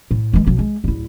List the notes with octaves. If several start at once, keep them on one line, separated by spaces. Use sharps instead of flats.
A2
E3 G#3
B1 F#3
G#3
D1 E4